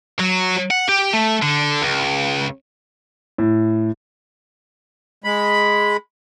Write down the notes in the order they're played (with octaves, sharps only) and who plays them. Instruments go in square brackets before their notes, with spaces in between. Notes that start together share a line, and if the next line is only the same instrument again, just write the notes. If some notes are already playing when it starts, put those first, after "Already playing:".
[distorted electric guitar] F#3
F#5
G4
A3
D3
C#2
[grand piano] A2
[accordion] G#3 B5